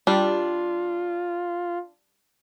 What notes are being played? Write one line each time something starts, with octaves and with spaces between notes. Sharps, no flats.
G3 D4 F4